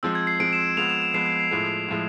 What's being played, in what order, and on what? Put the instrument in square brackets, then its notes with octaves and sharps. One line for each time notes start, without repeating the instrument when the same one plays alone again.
[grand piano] F3 G#3 C4 [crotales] E6
[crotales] G#6
C7
[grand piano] F3 G#3 C4 [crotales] D7
[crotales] E7
[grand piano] F3 G#3 B3 [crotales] F7
[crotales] E7
E7
[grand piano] F3 G#3 B3 [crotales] C7
[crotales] C7
C7
[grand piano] A2 F3 G#3
A2 F3 G#3